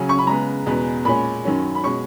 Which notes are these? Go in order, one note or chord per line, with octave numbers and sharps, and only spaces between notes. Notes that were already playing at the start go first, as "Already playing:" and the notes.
Already playing: C#3 F#3 C#4 G#5
C#6
B5
C#3 G#3 B3 A#5
E2 B2 G#3 B3
A#2 G#3 C#4 B5
F#2 D#3 F#3 C#4
B5
B2 G#3 C#4 C#6